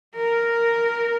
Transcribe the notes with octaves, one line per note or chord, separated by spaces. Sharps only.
A#4